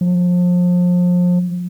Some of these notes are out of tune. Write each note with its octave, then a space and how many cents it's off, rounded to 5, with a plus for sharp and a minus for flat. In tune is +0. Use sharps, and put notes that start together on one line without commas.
F3 +30